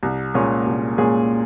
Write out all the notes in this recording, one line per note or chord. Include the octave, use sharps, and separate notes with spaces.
C2
A#2 G#3 C#4 G#4
C2
A#2 G#3 C#4 G#4